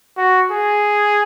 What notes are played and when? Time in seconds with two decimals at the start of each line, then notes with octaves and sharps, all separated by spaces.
0.17 F#4
0.52 G#4